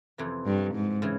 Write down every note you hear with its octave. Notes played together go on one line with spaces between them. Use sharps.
F2 C3 E3
G2
G#2
C#3 E3